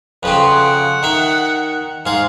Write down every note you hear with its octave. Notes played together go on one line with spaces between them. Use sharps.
F2 C#3 C4 B4
F#5
D#3 E5
G#2 G#4 F5